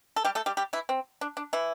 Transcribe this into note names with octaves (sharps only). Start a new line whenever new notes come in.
A4
G3 G4
A3 A4
G3 G4
G3 G4
E3 E4
C4
D4
D4
E3 E4